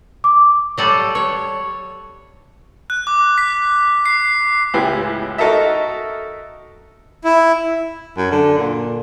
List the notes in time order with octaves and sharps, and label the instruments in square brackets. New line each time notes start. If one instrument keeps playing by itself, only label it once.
[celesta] D6
[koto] F#3 G3 A4
C#5
[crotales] F#6
D6
B6
C7
[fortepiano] C#2 A2 E4 G4 B4 G#5
D#4 F#4 A4 A#4 D#5 E5
[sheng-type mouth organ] E4
[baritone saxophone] F#2
D3
A#2